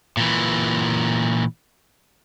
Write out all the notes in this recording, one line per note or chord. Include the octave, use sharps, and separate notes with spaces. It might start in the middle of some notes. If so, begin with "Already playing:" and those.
A#2 E3